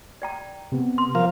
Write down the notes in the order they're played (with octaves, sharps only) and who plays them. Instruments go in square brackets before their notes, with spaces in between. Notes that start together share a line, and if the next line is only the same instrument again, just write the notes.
[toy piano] D5 G5 A#5
[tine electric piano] C3 B3
[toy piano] C6
[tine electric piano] F3 [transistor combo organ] A#4 F5